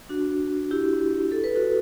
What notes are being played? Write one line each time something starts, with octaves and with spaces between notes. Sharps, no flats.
D4 F#4
E4 G4
A4
B4
F#4 A4